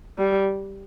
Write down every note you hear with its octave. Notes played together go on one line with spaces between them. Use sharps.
G3